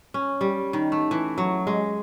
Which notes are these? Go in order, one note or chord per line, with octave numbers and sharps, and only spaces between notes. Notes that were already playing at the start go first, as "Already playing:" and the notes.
C#4
G3
D#3
A3
E3
F#3
G#3